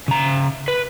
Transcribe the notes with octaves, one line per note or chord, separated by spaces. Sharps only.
C#3 A#5
B4